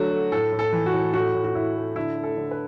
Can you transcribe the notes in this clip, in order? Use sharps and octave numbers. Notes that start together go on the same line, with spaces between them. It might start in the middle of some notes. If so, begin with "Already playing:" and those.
Already playing: D3 F#3 A3 F#4
A3
A2 A4
A2
A4
E3
F#4
A2
A2 F#4
A2
F#4
A2 E4
A3
D3 E4
A3
A4
D3
B4